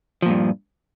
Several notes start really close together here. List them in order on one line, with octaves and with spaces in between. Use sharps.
F3 A#2 G2